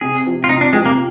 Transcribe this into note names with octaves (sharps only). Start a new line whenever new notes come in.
C3 G#4
F3 C4 G4
F4
C3 D#4
D4
F3 G#3 C4 G4
A#3